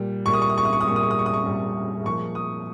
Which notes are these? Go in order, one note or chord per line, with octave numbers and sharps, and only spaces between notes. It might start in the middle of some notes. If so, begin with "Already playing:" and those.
Already playing: A#2 G3
A#2 G3 C#6
D#6
C#6
D#6
C#6
D#6
C#6
D#6
A#2 G3 C#6
D#6
C#6
D#6
C#6
D#6
C#6
A#2 G3
A#2 F3 G#3 C#6
D#6